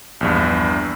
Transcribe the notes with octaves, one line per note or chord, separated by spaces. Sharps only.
A#1 E2 G2